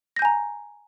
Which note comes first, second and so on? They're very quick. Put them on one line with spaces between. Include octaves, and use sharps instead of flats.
A#6 G6 G#5 A#5